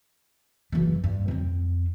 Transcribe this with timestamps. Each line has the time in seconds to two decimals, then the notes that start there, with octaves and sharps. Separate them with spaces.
0.72 F#1 E3
1.04 G2
1.28 F2 C4